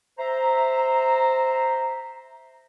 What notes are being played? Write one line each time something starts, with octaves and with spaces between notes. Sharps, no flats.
C5 E5 A#5